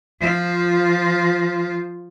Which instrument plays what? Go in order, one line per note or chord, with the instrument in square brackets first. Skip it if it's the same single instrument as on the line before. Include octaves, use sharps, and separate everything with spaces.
[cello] F3 F4